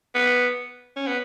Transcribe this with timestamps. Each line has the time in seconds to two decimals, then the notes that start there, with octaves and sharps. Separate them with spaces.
0.15 B3
0.96 C#4
1.07 B3